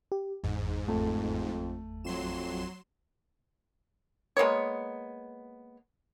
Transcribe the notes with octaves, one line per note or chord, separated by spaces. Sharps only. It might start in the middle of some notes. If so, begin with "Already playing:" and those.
G4
G1 E2 G#2
F2 A3
F2 F#3 C6 E7
G#3 A#3 B3 C#5